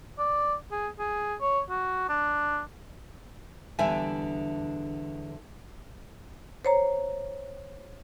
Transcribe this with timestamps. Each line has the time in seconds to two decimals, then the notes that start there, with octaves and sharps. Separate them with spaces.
0.19 D5
0.71 G#4
0.99 G#4
1.41 C#5
1.70 F#4
2.09 D4
3.79 E2 D3 G3 D4 E5 G#5
6.65 C5 C#5 A#5